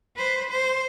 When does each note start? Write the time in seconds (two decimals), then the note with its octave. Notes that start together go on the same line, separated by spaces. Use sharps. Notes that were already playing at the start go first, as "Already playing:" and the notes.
0.16 B4 C5
0.51 C5